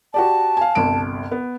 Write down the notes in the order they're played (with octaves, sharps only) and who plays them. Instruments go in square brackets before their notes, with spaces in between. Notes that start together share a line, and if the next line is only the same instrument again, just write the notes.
[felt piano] F#4 G4 D5 [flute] A5
[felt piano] F5 G#5
G1 C2 D7
B3